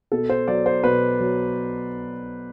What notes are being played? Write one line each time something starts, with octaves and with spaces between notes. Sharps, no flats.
B2 A4
C5
F#3 D5
C5
B2 B4
F#3